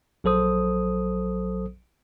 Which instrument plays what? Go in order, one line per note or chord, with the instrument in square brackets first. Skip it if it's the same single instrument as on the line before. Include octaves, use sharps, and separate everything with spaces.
[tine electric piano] A#1 F#3 A4 C5 D#6